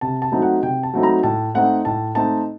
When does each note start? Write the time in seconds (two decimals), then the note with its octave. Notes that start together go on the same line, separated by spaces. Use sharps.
0.01 C3 A5
0.22 A5
0.32 F#3 A3 C4 D#4
0.42 F#5
0.62 C3 G5
0.83 A5
0.94 F#3 A3 C4 D#4
1.03 A#5
1.23 A2 A5
1.54 A3 C4 D#4 F#5
1.85 A2 A5
2.15 A3 C4 D#4 A5